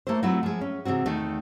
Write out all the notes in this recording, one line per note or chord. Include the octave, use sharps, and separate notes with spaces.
A3 A#3 E4 C5
F#3 A3 C4 E4 F4
F3 G#3
C#4
C3 E3 G#3 C4 F#4
E2 D#3 A3